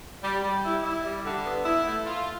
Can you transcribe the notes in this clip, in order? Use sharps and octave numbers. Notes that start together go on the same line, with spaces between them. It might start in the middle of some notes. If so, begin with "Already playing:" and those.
G3
G3
E4
E4
G3
D3
B3
E4
A3
F4